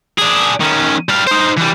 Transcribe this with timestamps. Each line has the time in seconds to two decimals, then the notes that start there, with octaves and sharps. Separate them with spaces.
0.19 D4 G#4
0.61 D#3 C#4
1.09 G3 F5
1.27 D#4 C5
1.57 E3 G3